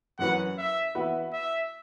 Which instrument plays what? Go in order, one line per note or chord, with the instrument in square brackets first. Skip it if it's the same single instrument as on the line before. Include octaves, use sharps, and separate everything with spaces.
[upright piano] F#2 E3 C#4 F#4 B4 [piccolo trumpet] F#5
[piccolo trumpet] E5
[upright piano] E3 B3 F#4 B4 E5
[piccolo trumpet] E5